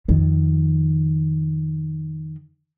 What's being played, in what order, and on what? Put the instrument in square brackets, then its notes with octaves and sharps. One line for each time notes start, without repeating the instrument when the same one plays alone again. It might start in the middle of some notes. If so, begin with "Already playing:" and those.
[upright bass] F2 D#3